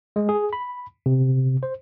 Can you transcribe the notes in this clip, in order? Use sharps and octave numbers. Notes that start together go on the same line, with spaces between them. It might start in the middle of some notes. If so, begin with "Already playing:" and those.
G#3
G#4
B5
C3
C5